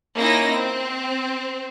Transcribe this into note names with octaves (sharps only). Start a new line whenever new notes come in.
A#3 C#4 D#4 E4 A#6
C4